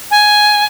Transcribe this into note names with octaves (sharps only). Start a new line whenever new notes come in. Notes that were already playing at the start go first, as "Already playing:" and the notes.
G#5